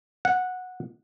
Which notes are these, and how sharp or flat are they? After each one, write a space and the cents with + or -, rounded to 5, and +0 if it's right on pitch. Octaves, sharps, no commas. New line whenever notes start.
F#5 -10